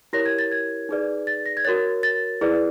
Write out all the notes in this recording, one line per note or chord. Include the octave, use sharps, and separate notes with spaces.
E4 G4 A#4 C#5 A#6
G#6
A6
G#6
D#4 G#4 B4 D5
A6
A#6
G#6
F#4 A#4 C#5 A6
A6
E4 G#4 B4 D5